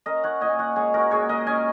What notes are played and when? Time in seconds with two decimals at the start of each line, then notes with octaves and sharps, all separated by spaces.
0.06 C#4 A#4 D#5
0.24 C#5 F#5
0.41 A#2 D#5 G#5
0.59 C#5 F#5
0.76 G#3 G#4 C#5
0.94 F#4 A#4
1.11 A#2 G#4 C#5
1.29 A#4 D#5
1.47 C#4 D#5 G#5